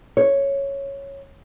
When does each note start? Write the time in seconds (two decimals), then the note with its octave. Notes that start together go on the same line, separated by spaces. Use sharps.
0.17 C#5